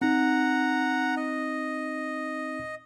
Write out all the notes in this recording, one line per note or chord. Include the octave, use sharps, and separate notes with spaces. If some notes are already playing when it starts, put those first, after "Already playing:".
C4 D#4 F#5 A#5
D#5